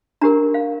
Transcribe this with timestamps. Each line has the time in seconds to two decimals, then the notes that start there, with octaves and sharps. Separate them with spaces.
0.21 D4 G4 A#4 A#5
0.54 F5